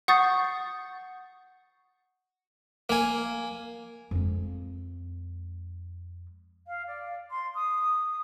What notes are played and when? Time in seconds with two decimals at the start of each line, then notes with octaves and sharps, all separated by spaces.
0.08 F#5 C#6 D#6 G6 A6 C7
2.89 A#3 G#5
4.11 F2 G#3
6.67 F5
6.86 D5
7.30 C6
7.54 D#6